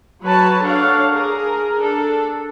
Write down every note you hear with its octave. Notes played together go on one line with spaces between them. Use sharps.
F#3 B4 C#5 A5
D4 A4 C#5 F5 F#5
G#4 A#4
D4 A4